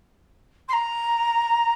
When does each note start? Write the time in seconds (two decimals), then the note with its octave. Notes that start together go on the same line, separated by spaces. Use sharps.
0.68 C6
0.72 A#5